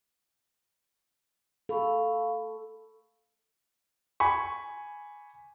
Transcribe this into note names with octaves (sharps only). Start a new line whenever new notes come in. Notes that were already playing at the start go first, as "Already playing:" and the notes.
A4 F5 B5 C#6
G#5 B5 C#6